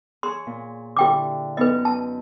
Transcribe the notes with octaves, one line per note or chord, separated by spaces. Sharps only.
G#4 C#5 C6
A#2
D3 E4 G4 G5 D6
F#2 B3 D#4 B4 D#5
A5